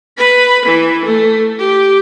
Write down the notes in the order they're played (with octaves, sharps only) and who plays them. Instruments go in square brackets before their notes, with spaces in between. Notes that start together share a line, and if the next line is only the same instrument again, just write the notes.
[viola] B4 B5
E3
A3
G4